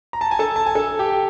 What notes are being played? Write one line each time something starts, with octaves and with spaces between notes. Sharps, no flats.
A#5
A5
G#5
A4 A5
A5
G#5
A4 A5
G4 G5